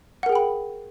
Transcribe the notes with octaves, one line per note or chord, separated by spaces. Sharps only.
G#4 A#4 F#5 G5 B5